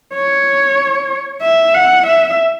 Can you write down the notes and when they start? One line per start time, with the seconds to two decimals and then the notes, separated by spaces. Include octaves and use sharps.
0.14 C#5
1.42 E5
1.75 F#5
2.07 E5